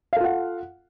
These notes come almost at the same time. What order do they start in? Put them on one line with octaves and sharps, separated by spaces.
F5 A4 F4 F#5